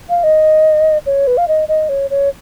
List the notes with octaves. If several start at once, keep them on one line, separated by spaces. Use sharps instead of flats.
F5
D#5
C#5
B4
F5
D#5
D#5
C#5
C#5